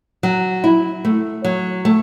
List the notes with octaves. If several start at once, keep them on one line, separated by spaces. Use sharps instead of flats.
F#3
E4
A3
F#3
A3